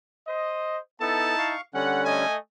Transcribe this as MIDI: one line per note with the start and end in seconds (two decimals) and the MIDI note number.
0.27 0.78 72
0.27 0.78 75
1.00 1.35 59
1.00 1.54 63
1.00 1.54 64
1.00 1.35 69
1.00 1.54 81
1.38 1.61 77
1.38 1.61 85
1.74 2.25 50
1.74 2.25 55
1.74 2.25 61
1.74 2.04 78
2.05 2.36 57
2.05 2.36 75
2.05 2.36 80